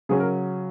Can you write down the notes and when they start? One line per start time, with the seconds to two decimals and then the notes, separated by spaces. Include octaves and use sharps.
0.09 C#3 F#3 C#4 G#4
0.20 A#4